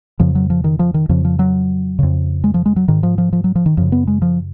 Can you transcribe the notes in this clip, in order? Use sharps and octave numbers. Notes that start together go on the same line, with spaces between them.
F2 C#3 F3
F#3
F3
D#3
F3
D#3
F2 C#3 F3
F3
F#3
F2 C#3
G#3
F3
G#3
F#3
G#2 D#3
F3
F3
F3
F#3
F3
D#3
F#2 C#3 F3
B3
G#3
F3